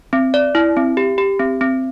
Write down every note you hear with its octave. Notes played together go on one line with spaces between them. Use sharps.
C4
D5
E4
C4
G4
G4
C4
C4